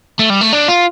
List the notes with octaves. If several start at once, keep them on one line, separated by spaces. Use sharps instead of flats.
A3
G3
A3
D4
F4